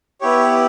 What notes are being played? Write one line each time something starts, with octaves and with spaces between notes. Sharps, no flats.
B3 E4 G4 C#5